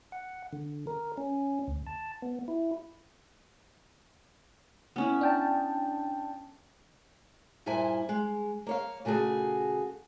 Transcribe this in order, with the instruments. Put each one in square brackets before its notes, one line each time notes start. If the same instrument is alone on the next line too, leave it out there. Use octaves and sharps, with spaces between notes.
[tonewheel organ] F#5
D3
A#4
C#4
D2
A5
B3
E4
[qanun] B3 C#4 E4
[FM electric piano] D4 G5 A5
[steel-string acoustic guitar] G2 A#2 E4 C5 G#5
G#3
A#3 C#5 F5
A#2 C#3 A3 F#4 G#4